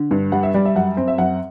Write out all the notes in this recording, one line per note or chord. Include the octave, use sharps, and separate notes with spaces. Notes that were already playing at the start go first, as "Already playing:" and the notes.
Already playing: D3
G2
G3 F#5
E5
G3 D5
E5
F#2 F#5
C4 C5
E5
F#2 F#5